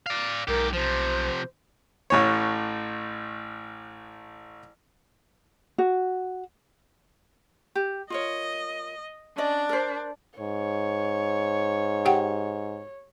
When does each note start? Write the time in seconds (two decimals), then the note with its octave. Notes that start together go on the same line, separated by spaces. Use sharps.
0.06 D5 F5
0.48 B1 G#2 G4 A#4
0.73 C3 F3 C5
2.10 A1 A2 C#5
5.78 F#4
7.75 G4
8.10 F4 A#4 C#5 D#5
9.38 C#4 D4 D5 D#5
9.69 A#4 C5
10.40 G#2 C#5
12.05 G4 F#5 G5